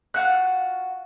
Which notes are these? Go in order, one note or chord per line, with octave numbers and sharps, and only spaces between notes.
F4 F#4 F#6